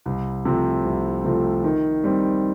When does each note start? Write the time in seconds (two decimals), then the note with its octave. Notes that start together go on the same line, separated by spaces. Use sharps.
0.06 C2
0.45 C3 F3 A3 C4
0.85 C2
1.24 C3 F3 A3 C4
1.64 D#3
2.04 G3 C4